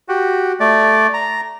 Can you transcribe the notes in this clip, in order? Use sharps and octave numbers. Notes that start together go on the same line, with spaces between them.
F#4 G4
A3 D5
A#5